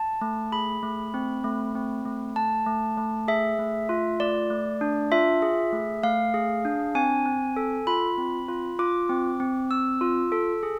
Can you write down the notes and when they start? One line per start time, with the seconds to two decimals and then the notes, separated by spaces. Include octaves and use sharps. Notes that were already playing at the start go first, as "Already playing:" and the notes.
Already playing: A5
0.21 A3
0.52 G#4 B5
0.83 A3
1.14 C4
1.44 A3
1.75 C4
2.05 A3
2.36 A3 A5
2.66 A3
2.97 A3
3.28 G#4 E5
3.59 A3
3.89 F4
4.20 A3 D5
4.50 A3
4.81 D4
5.12 F4 E5
5.42 G#4
5.73 A3
6.03 A3 F5
6.34 G#4
6.65 D4
6.95 C4 G#5
7.26 C4
7.56 A4
7.87 F4 B5
8.18 C4
8.48 F4
8.79 F4 D6
9.09 C4
9.40 C4
9.71 C4 E6
10.01 F4
10.32 A4
10.63 G#4